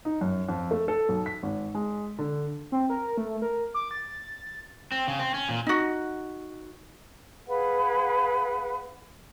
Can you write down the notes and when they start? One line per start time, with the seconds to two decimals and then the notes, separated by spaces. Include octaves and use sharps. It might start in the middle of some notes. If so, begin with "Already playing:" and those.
0.05 D#4
0.21 F#2
0.49 F2
0.71 A3
0.88 A4
1.09 B1
1.26 B6
1.43 G#1
1.75 G#3
2.19 D3
2.72 C4
2.90 A#4
3.17 A3
3.42 A#4
3.74 D6
3.91 A6
4.92 C4
5.08 C#3
5.19 C4
5.34 C#4
5.49 A#2
5.67 D#4 F#4
7.47 G#4 B4 F5 F#5